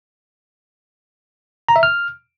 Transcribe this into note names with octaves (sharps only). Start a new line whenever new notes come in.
A#5
E5
F6